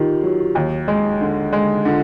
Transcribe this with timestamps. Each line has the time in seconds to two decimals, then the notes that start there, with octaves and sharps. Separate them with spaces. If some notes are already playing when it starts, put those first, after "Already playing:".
Already playing: D#3 F4 G4
0.23 F#3
0.55 D#2
0.88 G#3
1.21 D3
1.53 G#3
1.85 D3 F4